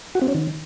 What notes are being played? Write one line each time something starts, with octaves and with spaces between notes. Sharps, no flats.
F#4
C4
C#4
D#3